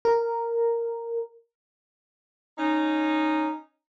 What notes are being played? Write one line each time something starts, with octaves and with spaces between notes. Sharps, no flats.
A#4
C#4 D#4